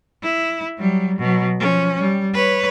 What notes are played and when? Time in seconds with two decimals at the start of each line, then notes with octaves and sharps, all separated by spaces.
0.23 E4
0.78 F#3 G3
1.19 B2 F#3
1.60 F3 C#4
2.00 G3
2.34 B4 C#5